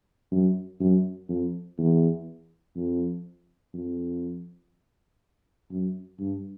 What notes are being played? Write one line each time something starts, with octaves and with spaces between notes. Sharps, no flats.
F#2
F#2
F2
E2
F2
F2
F#2
G2